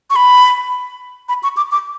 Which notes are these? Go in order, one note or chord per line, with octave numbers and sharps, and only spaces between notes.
C#6
B5
B5
C#6
D6
D6